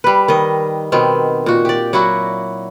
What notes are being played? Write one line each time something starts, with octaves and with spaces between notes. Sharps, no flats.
G3 B4
D#3 D#5
B2 D#3 B3 C4
A#2 F#4
G4 D5
F#3 E4 F#4